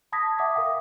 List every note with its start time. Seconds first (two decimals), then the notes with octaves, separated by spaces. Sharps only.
0.12 A5 B5 D#6 G#6 A#6 B6
0.39 E5 F#5 D6 D#6
0.55 A#4 E5 F5 G5